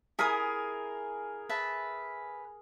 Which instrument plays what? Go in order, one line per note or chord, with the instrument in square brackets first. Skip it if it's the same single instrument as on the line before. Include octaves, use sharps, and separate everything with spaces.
[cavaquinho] E4 G#5 D#6 [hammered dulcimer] G#4 A#4
[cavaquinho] B4 E5 A5